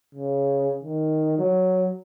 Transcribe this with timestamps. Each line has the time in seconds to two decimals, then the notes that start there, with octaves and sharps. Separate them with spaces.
0.14 C#3
0.83 D#3
1.38 F#3